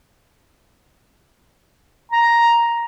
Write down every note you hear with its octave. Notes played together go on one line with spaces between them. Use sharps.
A#5